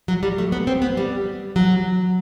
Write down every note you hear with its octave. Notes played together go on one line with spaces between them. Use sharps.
F#3
G3
A3
B3
C4
B3
G3
F#3